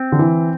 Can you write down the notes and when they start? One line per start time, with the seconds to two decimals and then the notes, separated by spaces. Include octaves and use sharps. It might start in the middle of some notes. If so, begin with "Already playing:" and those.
Already playing: C4
0.12 D3
0.19 E3